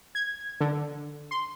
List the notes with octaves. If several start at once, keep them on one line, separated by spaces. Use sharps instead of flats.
G#6
D3
C6